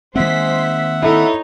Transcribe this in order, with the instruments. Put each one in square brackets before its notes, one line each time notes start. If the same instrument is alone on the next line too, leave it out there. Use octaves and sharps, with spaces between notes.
[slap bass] D#3 A#3 C4 [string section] G#3 C5 B6 [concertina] E5 F#5
[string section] D#4 C#5 [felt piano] E4 A4